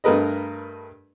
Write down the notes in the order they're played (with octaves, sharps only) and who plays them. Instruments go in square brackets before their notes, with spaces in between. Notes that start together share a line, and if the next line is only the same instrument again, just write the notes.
[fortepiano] G2 A3 A#4 B4 D#5